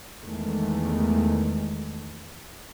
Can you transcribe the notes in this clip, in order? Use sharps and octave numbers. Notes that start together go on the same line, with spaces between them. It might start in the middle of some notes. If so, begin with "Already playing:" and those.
E2 D#3 G#3 A3